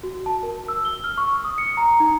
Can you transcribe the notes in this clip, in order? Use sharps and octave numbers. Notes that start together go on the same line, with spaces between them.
F#4
A5
A#4
E6
G7
F6
C#6
D#6
C#7
A#5
D#4